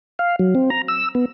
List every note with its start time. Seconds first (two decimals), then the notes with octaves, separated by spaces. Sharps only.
0.19 F5
0.39 F#3
0.55 C4
0.70 A#5
0.88 E6
1.15 B3